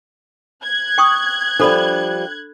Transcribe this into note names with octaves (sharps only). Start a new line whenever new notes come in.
F#6 G#6
G5 C#6 D#6
F3 G3 D4 A4 B5